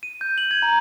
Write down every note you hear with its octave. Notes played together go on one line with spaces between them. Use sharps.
D#7
G6
F#7
G#6
A#5